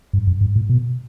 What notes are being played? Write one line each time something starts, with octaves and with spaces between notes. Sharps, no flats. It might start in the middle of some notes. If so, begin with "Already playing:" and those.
G2
F#2
G2
A2
B2